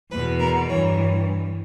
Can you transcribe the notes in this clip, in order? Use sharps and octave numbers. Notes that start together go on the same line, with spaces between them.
E2 B2 B4
A#4
G2 E3 C#5